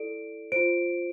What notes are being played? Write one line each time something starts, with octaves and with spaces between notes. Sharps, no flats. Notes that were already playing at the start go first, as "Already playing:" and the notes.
Already playing: E4 A4 D5 D7
F4 C5 D7